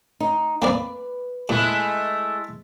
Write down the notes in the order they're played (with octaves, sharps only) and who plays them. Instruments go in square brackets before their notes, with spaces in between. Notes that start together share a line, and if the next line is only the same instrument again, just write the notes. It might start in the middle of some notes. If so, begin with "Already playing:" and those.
[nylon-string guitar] D#4
[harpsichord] A#3 C4 D5 [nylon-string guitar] B4
[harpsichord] A#2 [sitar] G#3 A3 E4